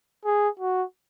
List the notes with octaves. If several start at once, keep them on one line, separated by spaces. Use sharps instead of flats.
G#4
F#4